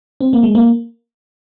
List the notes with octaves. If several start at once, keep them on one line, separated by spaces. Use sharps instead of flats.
C4
A#3
G#3
A#3